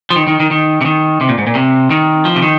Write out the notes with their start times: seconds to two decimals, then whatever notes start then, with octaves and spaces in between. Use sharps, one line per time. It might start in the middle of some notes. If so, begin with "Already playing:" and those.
0.10 F3
0.16 D#3
0.28 D#3
0.40 D#3
0.51 D#3
0.81 C3
0.85 D#3
1.21 C3
1.29 A#2
1.38 G#2
1.47 A#2
1.55 C3
1.91 D#3
2.25 F3
2.36 C3
2.42 D#3